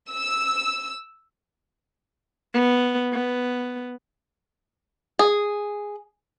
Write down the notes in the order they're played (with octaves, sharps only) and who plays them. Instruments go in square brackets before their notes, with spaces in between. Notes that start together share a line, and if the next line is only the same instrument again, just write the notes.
[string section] E6
[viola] B3
B3
[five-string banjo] G#4